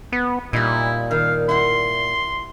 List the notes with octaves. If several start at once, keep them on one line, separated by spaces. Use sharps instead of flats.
B3
A#2 G3 D#4 E4
D#3 F5
E4 F#5 C6